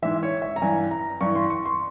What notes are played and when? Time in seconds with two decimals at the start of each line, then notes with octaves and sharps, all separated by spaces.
0.02 G#2 E3 E5
0.23 C#5
0.42 E5
0.56 A#5
0.62 G2 E3 G#5
0.91 A#5
1.21 G2 E3 C#6
1.35 C6
1.50 C#6
1.65 C6